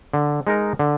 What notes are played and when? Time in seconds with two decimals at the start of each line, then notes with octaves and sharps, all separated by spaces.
0.13 D3
0.47 G#3 D#4 A#4
0.79 D3